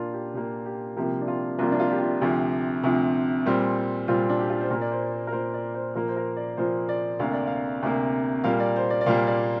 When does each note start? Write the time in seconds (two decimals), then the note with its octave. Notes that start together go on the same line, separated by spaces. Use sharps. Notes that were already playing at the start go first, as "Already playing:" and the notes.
Already playing: A#2 A#3 D4 F4
0.13 G4
0.34 A#2 A#3 G4
0.65 G4
0.97 C2 C3 F3 A#3 G4
1.21 D4
1.28 F4
1.59 C2 C3 F3 A#3 F4
1.72 D4
1.80 F4
1.91 G4
2.00 F4
2.21 D2 C3 F3 G4
2.83 D2 C3 F3
3.46 A#2 G3 C4
4.08 A#2 G3 C4 F4
4.29 D4
4.40 G4
4.50 F4
4.61 C5
4.70 A#2 A#3 A#4
4.81 D5
4.91 C5
5.12 C5
5.27 A#4
5.32 A#2 A#3 C5
5.54 D5
5.74 C5
5.95 A#2 F3 A#3 A#4
6.08 C5
6.16 A#4
6.36 D5
6.57 A#2 F3 A#3 C5
6.89 D5
7.20 D2 C3 A#3 F5
7.33 D5
7.47 F5
7.82 D2 C3 A#3
8.44 A#2 G3 A#3 F5
8.60 D5
8.76 C5
8.90 D5
9.01 D5
9.06 A#2 G3 A#3 F5
9.27 D5